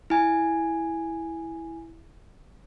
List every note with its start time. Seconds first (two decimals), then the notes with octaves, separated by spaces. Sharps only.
0.10 E4 G#5